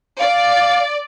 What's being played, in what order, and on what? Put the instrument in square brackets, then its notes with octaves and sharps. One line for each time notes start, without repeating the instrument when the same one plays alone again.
[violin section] D5 [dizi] F5